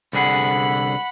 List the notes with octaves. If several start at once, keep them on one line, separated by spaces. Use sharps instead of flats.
C2 D3 G#4 F#5 B5